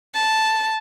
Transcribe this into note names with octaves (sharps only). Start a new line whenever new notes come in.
A5